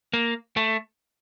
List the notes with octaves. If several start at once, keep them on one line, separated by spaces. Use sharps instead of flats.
A#3
A3